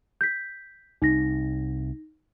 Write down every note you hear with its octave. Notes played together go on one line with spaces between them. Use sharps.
G6 B6
C2 D#4 A#6